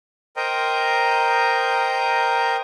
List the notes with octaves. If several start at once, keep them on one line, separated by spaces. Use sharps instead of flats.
A#4 C5 D#5 G5 A#5